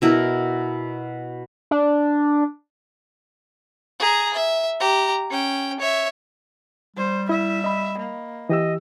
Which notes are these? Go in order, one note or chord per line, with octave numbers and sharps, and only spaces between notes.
B2 E4 A#4
D4
G#4 A#5
E5
G4 A#5
C#4 G5
C#5 E5
G3 C5
E4 E5
D#5 B5
A#3
E3 G4 D#5 E6